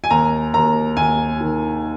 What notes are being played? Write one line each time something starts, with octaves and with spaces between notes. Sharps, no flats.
G#5
D#2 A#5
D#2 A#5
D#2 G#5
D#3